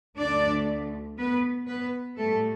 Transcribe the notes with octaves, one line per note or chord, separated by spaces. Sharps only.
D2 D3 A3 D4 D5
B3 B4
B3 B4
A2 G3 A3 A4